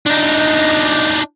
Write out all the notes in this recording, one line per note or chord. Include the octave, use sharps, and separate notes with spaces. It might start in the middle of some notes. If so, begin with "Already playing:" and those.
D4 D#4